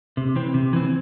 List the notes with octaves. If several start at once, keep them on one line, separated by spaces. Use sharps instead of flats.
C3
E3 C4
C3
E3 C4